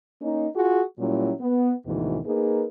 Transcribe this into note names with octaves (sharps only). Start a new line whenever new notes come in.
A#3 C#4 D#4
F4 F#4 G#4
A#2 F#3 G3 C#4 E4
B3
D2 G#2 B2 D#3 E3
A#3 D#4 G#4 A#4 B4